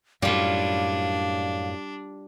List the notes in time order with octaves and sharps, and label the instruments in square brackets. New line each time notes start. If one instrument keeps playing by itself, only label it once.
[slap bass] F#2 A2 [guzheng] G3 F4 [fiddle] D4 [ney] F5